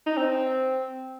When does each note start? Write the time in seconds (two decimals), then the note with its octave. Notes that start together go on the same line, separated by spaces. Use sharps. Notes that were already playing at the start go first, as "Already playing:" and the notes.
0.06 D#4
0.17 C4